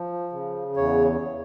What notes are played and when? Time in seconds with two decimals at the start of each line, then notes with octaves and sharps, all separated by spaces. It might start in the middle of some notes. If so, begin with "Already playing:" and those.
Already playing: F3
0.32 C#3
0.77 E2 C#5